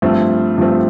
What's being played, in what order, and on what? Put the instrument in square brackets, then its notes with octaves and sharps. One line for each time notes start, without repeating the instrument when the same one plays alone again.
[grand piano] G2 F3 A3 C4
G2 F3 A3 C4